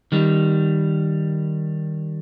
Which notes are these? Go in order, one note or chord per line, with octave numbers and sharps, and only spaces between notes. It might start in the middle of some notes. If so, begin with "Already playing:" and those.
D#3 G3